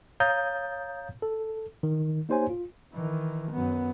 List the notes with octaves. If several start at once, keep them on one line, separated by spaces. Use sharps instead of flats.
C#5 F5 A#5 D#6 G6 A6
A4
D#3
A#3 D#4 G4 C5 C#5 G#5
F4
D#3 E3
F#2 B3